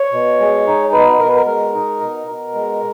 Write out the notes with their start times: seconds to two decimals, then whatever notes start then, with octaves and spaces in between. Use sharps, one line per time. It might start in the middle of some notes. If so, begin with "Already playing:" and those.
Already playing: C#5
0.12 B2
0.40 G#3
0.67 D#4
0.93 B2 B4
1.20 B2 A#4
1.28 B4
1.36 A#4
1.47 G#3 A#4
1.74 D#4
2.01 B2
2.27 B2
2.54 G#3